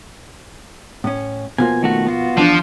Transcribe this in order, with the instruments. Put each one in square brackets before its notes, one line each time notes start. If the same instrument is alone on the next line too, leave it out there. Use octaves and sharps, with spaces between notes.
[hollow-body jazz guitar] A2 C#4
[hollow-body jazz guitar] B2 F3 A#3 [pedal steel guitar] G#5
[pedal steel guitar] D#3 A3 F#4
B3 F4 F#4
[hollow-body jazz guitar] E2 D4 [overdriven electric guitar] F3